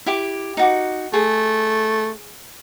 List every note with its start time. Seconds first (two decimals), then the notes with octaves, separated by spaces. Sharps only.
0.06 E4 G4 D6
0.57 D#4 F#4 D6
1.13 A3 G#4